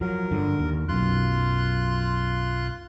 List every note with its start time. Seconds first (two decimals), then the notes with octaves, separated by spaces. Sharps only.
0.01 F3 F#3 A#4
0.31 G2 D3
0.59 D#2
0.89 B1 F#2 F4 C6 F#6